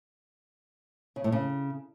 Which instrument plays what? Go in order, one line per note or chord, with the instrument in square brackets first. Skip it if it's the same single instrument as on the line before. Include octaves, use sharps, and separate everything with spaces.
[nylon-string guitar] C#3
A2
C#3